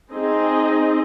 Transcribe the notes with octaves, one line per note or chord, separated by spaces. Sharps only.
C4 D#4 G#4 D#5